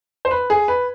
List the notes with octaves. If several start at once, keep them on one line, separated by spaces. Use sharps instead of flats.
C5
B4
G#4
B4